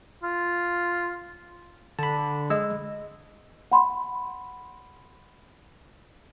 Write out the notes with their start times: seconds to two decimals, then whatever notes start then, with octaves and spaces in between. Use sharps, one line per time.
0.23 F4
1.99 D3 A5 B5
2.50 G#3 D#5 E6
3.72 F#5 B5 C6